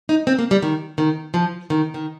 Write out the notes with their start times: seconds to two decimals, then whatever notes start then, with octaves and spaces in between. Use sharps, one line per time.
0.09 D#4
0.27 C4
0.39 A#3
0.51 G3
0.62 D#3
0.98 D#3
1.34 F3
1.70 D#3
1.94 D#3